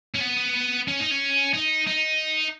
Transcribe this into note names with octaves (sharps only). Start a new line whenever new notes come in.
C#4
B3
C#4
D#4
C#4
D#4
D#4